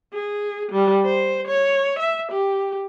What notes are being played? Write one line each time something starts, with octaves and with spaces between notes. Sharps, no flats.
G#4
G3
C5
C#5
E5
G4